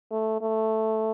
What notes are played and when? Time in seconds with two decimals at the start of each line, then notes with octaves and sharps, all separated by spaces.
0.11 A3
0.41 A3